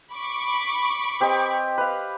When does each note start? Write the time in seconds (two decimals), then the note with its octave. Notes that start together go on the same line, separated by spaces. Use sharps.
0.13 B5 C#6 D6
1.20 C4 G4 D#5
1.78 B4 F5